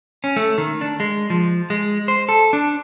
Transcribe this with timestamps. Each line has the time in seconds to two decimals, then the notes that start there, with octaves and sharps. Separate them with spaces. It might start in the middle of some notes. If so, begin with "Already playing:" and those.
0.24 C#4
0.36 A3
0.58 D#3
0.81 D4
1.00 G#3
1.30 F3
1.70 G#3
2.08 C5
2.29 A4
2.53 D4